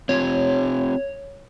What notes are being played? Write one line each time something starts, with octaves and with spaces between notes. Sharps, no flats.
C4 F4 G4 C#5